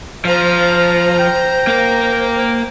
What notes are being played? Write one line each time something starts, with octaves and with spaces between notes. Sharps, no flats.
F3 C5 F5 A#5
G5
A#3 A#4